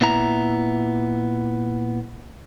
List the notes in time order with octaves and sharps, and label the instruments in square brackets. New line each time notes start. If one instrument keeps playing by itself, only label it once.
[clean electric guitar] A#2 B3 E4 A#5